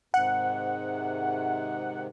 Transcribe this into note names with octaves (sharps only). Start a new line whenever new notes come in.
G#2 C3 D#3 F#5